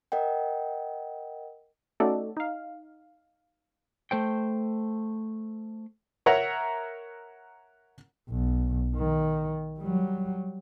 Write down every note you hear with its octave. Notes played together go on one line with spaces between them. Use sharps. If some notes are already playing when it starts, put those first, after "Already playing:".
A#4 D#5 F#5 G5
A3 C#4 D#4 F#4 A4 D5
D#4 F5
A3 C5 G5
A#4 C#5 E5 F#5 A#5
B1
D#3
F#3 G3